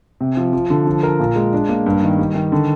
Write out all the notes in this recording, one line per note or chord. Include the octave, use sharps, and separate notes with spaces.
C3
F3
F3
D3
F3
A#4
A#2
G#3
D4
A#3
G2
D#3
G3
D#3
D3